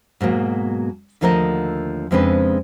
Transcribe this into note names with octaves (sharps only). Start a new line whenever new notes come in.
G#2 B2 F#3 A#3
D#2 D3 F3 A3 A#4 D#5
F2 C#3 G#3 C4 D4 B4